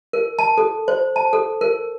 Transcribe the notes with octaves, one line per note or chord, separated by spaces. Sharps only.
A#4
A5
A4
C5
A5
A4
A#4